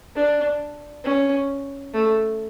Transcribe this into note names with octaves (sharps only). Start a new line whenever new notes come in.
D4
C#4
A3